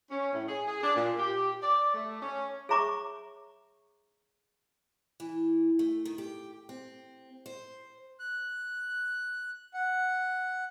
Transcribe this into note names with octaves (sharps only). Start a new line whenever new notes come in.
C#4
A2
G#4
G#4
D4
A#2
G4
D5
A3
C#4
G#4 C#5 E5 A#5 C#6 D6
E3
A3
D#3
G4
C4
C5
F#6
F#5